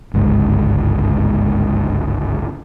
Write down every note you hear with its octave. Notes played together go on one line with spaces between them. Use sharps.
G1 C#2 G#2